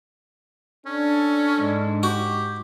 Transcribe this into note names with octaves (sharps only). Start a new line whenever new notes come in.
C#4 D4 A4
G#2
F#4 G4